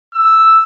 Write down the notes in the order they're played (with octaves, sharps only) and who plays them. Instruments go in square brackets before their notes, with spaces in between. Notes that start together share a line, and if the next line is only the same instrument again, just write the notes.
[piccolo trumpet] E6